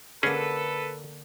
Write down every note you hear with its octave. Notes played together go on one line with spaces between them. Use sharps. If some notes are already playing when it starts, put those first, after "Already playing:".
D3 A#3 C#4 G#4 A4 B4